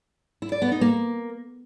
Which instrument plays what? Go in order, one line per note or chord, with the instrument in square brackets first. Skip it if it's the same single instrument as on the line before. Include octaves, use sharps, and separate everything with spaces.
[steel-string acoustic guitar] E4
D5
B3
D#4
A#3